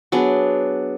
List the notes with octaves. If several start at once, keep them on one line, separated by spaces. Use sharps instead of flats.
F#3 B3 D4 G#4